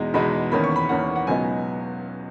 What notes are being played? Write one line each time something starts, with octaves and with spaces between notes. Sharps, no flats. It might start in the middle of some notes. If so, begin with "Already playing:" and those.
Already playing: E2 B2 G#3 D#4 A#5
E2 B2 G#3 D#4 B5
E2 D#3 A#3 C#4 B5
C#6
B5
E2 D#3 A#3 C#4 F#5
F#5
C#2 B2 F#3 B3 D#4 G#5